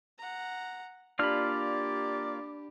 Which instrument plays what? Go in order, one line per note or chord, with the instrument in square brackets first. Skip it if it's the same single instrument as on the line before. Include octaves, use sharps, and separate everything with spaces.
[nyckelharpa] F#5 A#5
[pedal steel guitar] A#3 F4 F6 [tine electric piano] D4 B5 [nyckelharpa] G4 [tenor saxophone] D5